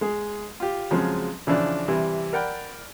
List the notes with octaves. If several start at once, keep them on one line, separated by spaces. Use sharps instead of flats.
G#3 G#4
F4 G4
F2 C#3 F3 F#3 G#3
C#3 E3 F3 D4
C3 E3 G3
A#4 D5 F#5 G5 B5